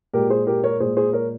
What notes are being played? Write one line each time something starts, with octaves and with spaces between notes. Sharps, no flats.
A#2 G#3 G4 A#4
G#4 C5
G4 A#4
A#4 C#5
A#2 G#3 G#4 C5
G#4 C5
A#4 C#5